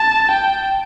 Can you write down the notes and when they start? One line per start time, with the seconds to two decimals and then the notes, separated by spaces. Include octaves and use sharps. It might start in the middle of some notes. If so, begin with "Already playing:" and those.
Already playing: A5
0.31 G5